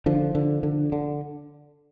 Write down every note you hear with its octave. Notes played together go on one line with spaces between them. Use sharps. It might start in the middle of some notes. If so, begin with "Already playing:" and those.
D3 F3
D3
D3
D3